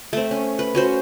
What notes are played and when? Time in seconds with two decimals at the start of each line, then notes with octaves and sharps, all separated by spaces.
0.13 A3 C4
0.31 C#4
0.59 B4
0.75 C#4 F#4 C5